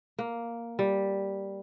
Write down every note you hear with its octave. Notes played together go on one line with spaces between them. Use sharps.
A#3
G3